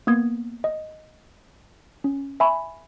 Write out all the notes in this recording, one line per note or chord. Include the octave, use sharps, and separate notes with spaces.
A#3 B3 D#6 G#6
D#5
C#4
E5 G#5 B5 C#6